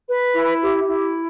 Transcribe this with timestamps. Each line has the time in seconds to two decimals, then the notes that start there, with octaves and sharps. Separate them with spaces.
0.08 B4
0.35 E4
0.61 G4
0.88 E4